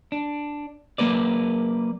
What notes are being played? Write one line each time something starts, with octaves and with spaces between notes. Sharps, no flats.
D4
F#3 A#3 A#4 B4 D5